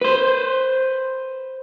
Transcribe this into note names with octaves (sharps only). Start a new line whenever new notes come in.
B4 C5